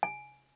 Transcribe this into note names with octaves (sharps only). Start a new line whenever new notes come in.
G#5